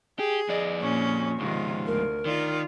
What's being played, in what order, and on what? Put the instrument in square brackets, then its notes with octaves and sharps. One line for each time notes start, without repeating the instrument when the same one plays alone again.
[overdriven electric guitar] G4 [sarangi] G#4
[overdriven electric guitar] F2 D5 [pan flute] D#5
[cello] A#2 [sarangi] C#4 [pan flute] C#6
[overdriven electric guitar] C#2 G#2 [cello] C3 D#3 [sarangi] F4
[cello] D2 [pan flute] A#4
[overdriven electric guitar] D#3 [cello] F4 [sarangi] D5